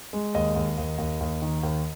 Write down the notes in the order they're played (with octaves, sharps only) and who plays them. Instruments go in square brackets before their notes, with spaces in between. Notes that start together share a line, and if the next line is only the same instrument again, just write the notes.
[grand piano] G#3
D#2 D#5
D#2
D#2
D#2
D#2
D#3
D#2